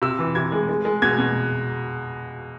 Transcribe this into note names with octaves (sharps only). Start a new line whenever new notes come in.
C3 E6
E3
C3 G#6
G#3
G#3
G#3
B2 G#6
B2